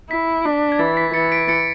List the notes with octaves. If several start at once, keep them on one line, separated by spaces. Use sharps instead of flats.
E4 B6
D4
G#6
E3 A6
B6
E3 A6 C#7
B6 D7
A6 C#7